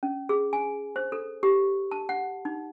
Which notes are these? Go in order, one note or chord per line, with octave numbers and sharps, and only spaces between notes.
C#4
G#4
G#5
C5
A4
G4
A5
F#5
D#4